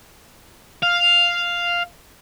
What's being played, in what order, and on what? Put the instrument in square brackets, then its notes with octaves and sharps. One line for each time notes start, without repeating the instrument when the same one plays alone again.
[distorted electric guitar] F5